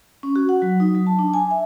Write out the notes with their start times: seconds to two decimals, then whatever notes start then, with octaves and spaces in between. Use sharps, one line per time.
0.23 C#4
0.36 F#4
0.49 F#5
0.62 F#3
0.80 D#4
0.95 F#3
1.07 A5
1.19 D4
1.34 G#5
1.51 E5